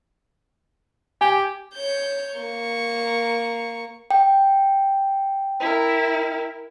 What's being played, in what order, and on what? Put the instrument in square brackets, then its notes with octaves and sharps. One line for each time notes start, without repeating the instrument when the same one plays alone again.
[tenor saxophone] G4 [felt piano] G#5
[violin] C#5 G6
A#3 C#6
[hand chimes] G5
[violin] E4 A#4